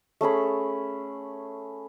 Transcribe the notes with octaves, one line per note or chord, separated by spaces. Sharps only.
A3 C#4 G#4 B5